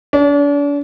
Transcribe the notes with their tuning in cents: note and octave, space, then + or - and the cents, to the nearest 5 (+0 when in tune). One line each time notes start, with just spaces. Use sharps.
D4 -40